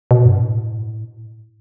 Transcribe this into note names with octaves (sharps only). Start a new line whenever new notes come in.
B2
G2
A2